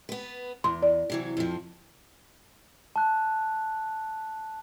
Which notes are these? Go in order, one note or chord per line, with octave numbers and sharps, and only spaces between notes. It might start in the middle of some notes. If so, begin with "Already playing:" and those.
B3 B4
E2 C6
D5
C3 E3 F#3
F2 F3
A5 F#6